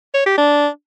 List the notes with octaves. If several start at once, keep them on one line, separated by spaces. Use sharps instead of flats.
C#5
G4
D4